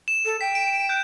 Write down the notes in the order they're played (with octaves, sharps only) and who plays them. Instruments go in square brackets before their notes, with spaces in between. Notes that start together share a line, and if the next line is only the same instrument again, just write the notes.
[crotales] E7
[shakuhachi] A4
[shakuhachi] G5 [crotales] B6
[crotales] D7
F#6 G6